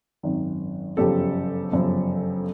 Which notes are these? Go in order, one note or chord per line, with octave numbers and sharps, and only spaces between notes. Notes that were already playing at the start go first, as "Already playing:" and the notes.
G#1 F#2 D#3
G1 F#2 C#3 F3 G4 A4
G1 F#2 C#3 F3